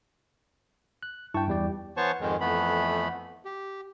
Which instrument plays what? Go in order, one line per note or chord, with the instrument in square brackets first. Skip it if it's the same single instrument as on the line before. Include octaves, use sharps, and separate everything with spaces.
[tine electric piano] F#6
[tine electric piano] G2 A5 C#6 [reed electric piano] E4 G5
[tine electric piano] E2 G3 D5
[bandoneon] E3 B3 C5 C#5 A5 C#6
F2 G#2 D#3 G#3
F2 E3 A3 B3 B5
G4